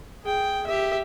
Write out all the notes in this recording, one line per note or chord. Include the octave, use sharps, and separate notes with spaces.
G#4 G5
G4 E5